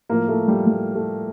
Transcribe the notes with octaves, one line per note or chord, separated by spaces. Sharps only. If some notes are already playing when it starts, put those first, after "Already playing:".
A2 F3 A#3
A3
G3
G3
A3